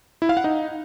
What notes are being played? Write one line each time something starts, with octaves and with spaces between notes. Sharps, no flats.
E4
F5
F#5
D#4